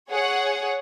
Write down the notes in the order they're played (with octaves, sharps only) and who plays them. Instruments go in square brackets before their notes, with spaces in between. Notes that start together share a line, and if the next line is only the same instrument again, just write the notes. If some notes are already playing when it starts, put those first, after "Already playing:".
[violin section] G#4 C#5 F#5